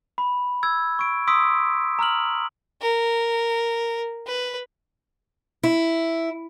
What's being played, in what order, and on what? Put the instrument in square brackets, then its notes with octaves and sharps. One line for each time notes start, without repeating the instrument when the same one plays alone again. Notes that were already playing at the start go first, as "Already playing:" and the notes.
[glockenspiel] B5
E6 G#6
C#6 D7
C6 D#6 E6 B6 D7
A#5 E6 F6 F#7
[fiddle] A#4
B4
[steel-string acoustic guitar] E4